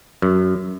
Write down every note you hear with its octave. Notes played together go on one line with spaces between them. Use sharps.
F#2